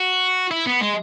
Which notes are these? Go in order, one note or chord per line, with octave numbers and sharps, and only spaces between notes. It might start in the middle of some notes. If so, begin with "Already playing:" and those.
Already playing: F#4
E4
B3
G#3